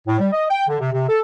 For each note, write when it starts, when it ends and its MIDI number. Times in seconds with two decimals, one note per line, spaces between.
0.07 0.17 45
0.20 0.29 55
0.32 0.44 75
0.50 0.64 79
0.68 0.79 50
0.80 0.92 48
0.92 1.08 48
1.09 1.20 69